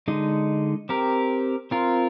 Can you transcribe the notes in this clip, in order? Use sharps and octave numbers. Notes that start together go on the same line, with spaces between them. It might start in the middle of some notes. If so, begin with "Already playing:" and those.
D3 G#3 D#4
C4 G4 A#4
C4 F4 A#4